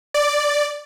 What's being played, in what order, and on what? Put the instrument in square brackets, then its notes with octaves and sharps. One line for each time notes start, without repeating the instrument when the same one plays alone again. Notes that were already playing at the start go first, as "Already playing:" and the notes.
[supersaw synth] D5